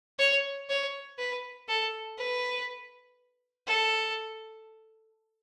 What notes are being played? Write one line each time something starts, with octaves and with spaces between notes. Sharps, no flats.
C#5
C#5
B4
A4
B4
A4